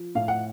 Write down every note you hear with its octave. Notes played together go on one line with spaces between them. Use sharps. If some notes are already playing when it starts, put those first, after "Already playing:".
Already playing: F3
A2 F5
F#5